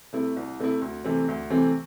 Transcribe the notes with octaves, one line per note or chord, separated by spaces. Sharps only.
C3 A3 E4
C2
C3 A3 E4
D2
C3 E3 A3 C4
D2
C3 E3 A3 C4